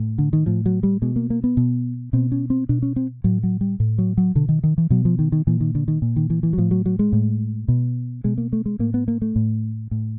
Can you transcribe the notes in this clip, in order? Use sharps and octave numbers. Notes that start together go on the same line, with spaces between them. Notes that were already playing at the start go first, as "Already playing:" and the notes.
Already playing: A2
D3
D#3
A2 F3
F#3
G3
B2 G#3
A#3
A#3
B3
B2
B2 C4
C#4
C4
B2 D4
C#4
C4
A2 F#3
F#3
G3
A2
F#3
F#3
B2 D3
D#3
D#3
E3
B2 F#3
F3
D#3
D#3
A#2 E3
D#3
D3
D#3
A#2
D#3
E3
E3
F#3
A2 F3
F#3
F#3
G#3
A2
B2
B2 G#3
A#3
A3
G#3
A2 A#3
B3
A#3
A3
A2
A2